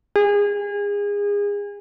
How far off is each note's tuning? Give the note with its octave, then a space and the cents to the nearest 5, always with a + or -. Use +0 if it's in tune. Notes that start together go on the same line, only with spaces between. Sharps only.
G#4 -30